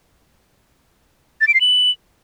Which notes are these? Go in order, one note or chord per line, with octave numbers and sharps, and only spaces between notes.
A6
D7
C7
F#7